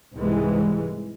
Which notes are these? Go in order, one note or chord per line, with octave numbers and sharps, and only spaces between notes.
C2 G#2 E3 G#3